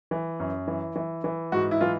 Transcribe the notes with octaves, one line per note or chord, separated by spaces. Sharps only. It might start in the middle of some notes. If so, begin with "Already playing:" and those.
E3
F#2
E3
E3
E3
G#2 F#4
E4
E3 F4